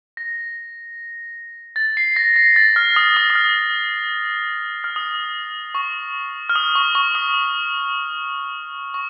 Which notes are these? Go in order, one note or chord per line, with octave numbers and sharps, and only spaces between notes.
A#6
A6
C7
A#6
A#6
A6
F6
D#6
D#6
D#6
F6
F6
D#6
C#6
F6
D#6
C#6
C#6
D#6
C#6